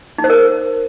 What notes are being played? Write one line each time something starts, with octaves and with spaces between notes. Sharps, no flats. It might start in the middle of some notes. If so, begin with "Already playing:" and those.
D#4
C5
A#4